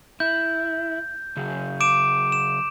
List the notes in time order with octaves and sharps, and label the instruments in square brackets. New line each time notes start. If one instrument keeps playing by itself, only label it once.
[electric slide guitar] E4 [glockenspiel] G6
[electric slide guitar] C#3 F#3 G#4
[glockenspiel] D6 D7 E7
E7